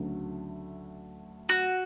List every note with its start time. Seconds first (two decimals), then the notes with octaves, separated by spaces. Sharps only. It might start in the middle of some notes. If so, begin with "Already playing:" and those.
Already playing: D2 C#3 F#3 A3
1.49 F#4